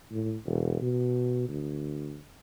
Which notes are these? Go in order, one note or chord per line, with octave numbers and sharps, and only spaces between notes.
A2
E1
B2
D2